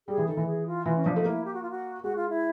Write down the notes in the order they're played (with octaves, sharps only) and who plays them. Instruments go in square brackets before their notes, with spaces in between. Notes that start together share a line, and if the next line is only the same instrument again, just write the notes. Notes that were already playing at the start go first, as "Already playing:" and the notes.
[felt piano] G3 [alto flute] G#4
[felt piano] E3
[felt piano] D#3 [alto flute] A4
[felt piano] E3
[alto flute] G#4
F4
[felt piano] E3 [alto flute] F4
[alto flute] C#4
[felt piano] F3 [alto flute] D4
[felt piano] A3 [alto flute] D#4
[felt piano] A#3 [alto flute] E4
[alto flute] G4
F#4
F4
F#4
[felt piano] G#3 [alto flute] F#4
[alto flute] F4
E4